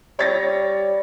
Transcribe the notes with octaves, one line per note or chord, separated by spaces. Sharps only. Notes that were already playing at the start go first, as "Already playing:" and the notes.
G3 C#5 A6 A#6